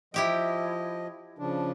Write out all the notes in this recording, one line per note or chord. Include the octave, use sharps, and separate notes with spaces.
F3 E4 G4 D#5 G5
C#3 F3 D4